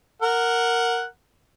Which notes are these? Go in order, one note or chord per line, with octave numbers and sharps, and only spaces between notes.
A#4 F#5